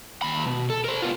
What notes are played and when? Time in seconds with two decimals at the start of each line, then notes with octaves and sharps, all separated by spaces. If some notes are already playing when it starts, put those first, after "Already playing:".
0.22 D#2 B5
0.47 B2
0.70 A4
0.84 A#4 C5
1.02 B3 F4